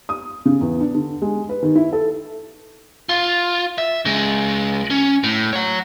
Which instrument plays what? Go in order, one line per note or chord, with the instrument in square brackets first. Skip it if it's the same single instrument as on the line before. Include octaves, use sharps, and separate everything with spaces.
[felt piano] D#6
C#3
E2
D4
D3
G#3
B4
D#3
E4
A4
[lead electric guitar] F4
E5
C#3 G#3
C#4
A2
C#5 F#5